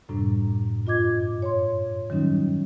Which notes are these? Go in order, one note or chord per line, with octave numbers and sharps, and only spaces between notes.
F#2 A2 C3 G3 D4
G2 F4 D#5 D6 G#6
C#5 C6
D#3 F#3 G3 C#4 D#4